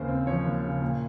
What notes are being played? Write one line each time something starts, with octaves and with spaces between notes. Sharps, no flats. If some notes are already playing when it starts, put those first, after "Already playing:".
Already playing: D#2 C#3 C5
C4
F3 C#5
D#2
C#3
A#2